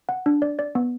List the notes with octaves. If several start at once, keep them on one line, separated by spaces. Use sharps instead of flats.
F#5
D4
D5
D5
B3